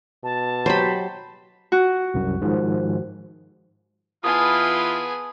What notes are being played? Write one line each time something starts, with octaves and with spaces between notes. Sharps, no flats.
B2 A5
F#3 G4 C5 B5
F#4
C2 F#2
G#2 D#3 F3
E3 B3 F4 G#4 G#5 A5 D#6